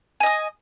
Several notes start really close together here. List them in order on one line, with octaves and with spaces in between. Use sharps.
G#5 D#5 D#6